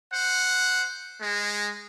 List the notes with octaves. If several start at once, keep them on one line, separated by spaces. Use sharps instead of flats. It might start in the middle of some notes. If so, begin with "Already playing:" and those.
C5 F#5
G#3